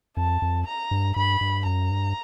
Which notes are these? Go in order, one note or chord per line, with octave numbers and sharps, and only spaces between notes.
F2 A5
F2
A#5
G2
G2 B5
G2
F#2 A#5
G2